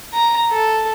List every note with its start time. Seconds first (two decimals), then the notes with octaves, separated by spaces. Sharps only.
0.13 A#5
0.51 A4